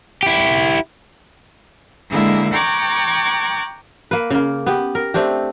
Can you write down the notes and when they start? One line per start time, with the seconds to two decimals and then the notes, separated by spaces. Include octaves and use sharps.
0.23 E4 G4
2.10 D3 G#3 A#3 E4
2.53 G5 A#5 C#6 D6 F#6 G#6
4.11 A#3 B4
4.31 C#3 A#3
4.66 B3 G4
4.95 A#4
5.14 A3 C4 D4 G4